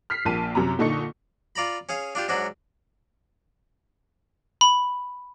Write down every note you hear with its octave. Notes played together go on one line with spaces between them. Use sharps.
F6 B6 C7
A#1 A#3 A5 D#7
F#2 C3 A#5
A#2 D3 D#4 A4 C#6 C#7
F4 D5 A#5 B5
C#4 G#4 F5
D4 F4 G4
G#2 F#3 D4 F#4
B5